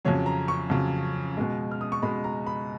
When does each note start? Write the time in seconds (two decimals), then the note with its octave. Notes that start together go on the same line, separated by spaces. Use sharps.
0.05 F2 C#3 F#3 C#5
0.26 A#5
0.48 C#6
0.70 F2 C#3 F#3
1.37 B2 G#3
1.71 F6
1.81 D#6
1.92 C#6
2.02 B2 G#3 B5
2.24 A#5
2.46 B5